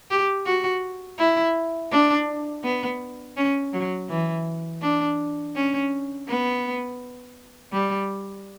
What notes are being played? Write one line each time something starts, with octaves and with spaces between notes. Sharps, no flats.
G4
F#4
E4
D4
B3
C#4
F#3
E3
D4
C#4
B3
G3